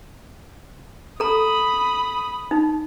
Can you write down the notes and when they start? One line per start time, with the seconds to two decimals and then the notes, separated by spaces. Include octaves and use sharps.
1.20 A4 A#5 B5 D#6
2.51 D#4